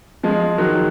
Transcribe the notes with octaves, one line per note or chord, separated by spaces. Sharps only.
F3 G#3
D#3 F#3